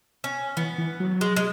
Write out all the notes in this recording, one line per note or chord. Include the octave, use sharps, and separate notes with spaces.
C#4
E3 B3
E3
F#3
G#3
G#3